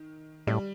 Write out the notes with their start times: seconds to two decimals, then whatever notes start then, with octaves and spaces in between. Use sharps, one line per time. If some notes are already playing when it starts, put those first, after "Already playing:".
Already playing: D#3
0.47 A2 G3